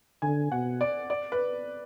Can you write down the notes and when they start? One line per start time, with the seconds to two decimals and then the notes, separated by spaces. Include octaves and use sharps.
0.22 D3 G#5
0.51 B2 F#5
0.81 D5
1.10 D5
1.32 B4